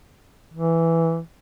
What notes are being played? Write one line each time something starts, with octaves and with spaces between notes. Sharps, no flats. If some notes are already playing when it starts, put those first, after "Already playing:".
E3